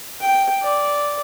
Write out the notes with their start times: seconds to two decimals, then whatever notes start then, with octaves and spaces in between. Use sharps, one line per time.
0.21 G5
0.62 D5